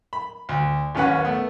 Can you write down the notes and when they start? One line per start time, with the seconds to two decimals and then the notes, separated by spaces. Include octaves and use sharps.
0.13 B5
0.49 D2
0.95 A1 D#2 C#4 B4 F#5
1.25 A3 B3